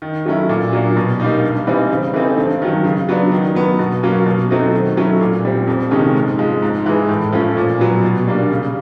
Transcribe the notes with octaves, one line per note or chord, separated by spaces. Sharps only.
D#3
F#3 A3 C#4 E4
A#2
F#3 A#3 D4
B2
G3 A#3 D#4
G2
E3 G3 C4 D#4
C#3
E3 A3 C4 D#4
G2
D#3 F#3
C#3
F#3 B3 D4
D#3
F#3 B3
B2
F#3 A#3 C#4
B2
F#3 A3 C4 D#4
D#3
F#3 A3 C#4 E4
A#2
G3 C4
F2
C3 D#3 G#3 C#4
G#2
F3 G#3
G#2
E3 G#3
A2
F3 A3 C#4
A#2
F#3 B3
B2
G3 A#3 D4
C#3